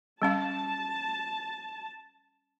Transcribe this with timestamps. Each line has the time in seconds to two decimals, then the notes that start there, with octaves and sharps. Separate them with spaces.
0.22 G3 C#4 F5 A5